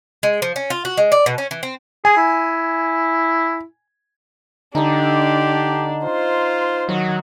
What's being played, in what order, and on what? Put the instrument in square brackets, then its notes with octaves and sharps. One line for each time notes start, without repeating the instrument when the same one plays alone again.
[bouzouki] G#3
F3
C#4
F4
F#4
G#3
D5
B2
C#4
E3
C4
[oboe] G#4 [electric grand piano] G#5
[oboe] E4
[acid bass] D3 [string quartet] D4 [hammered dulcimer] D#4 A5 [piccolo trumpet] G4
[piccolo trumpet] F4 [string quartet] C5
[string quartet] D#3 F#4 [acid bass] F#3